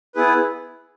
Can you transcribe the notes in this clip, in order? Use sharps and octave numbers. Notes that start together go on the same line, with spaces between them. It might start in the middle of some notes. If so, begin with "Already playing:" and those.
B3 E4 G#4 B4